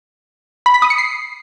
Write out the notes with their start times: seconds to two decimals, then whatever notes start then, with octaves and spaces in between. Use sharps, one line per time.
0.66 B5
0.74 B6
0.82 D#6
0.90 C#7
0.98 C7